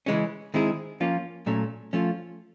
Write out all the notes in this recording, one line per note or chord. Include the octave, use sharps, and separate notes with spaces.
C#3 E3 G#3 C#4
D#3 G#3 C4 E4 G#4
F3 A#3 C#4 F4
A#2 F#3 A3 C#4
F3 A3 C#4 F4